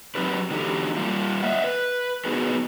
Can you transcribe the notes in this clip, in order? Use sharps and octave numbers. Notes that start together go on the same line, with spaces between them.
F#3 C4 D#4 G4 B4
D3 E3 D#4 F#4 G4 A4
G3 A#3 F4
D#5 E5 F#5
B4
B3 D#4 F#4 G#4 B4